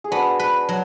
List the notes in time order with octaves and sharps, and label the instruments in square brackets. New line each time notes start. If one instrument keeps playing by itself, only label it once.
[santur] G#4
[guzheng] B3 [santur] D4 F#4
[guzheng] B4
F#3